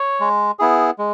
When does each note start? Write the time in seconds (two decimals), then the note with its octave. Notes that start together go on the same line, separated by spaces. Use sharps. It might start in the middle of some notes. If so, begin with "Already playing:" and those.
Already playing: C#5
0.20 G#3
0.59 B3 E4 G#4
0.98 G#3